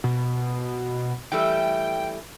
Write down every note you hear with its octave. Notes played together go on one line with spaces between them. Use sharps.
B2
E3 G3 A3 G5